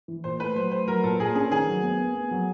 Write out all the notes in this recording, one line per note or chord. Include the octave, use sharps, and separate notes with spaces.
E3
A#2 C5
A3 B4
F#3 C5
A3 C5
F#3 A#4
A#2 A4
A#2 G#4
C#4 G#4
D#3 G#4
F#3
B3
B3
B3
F#3